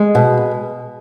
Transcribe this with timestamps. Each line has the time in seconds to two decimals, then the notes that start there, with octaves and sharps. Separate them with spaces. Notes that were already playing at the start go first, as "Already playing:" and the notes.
Already playing: G#3
0.15 B2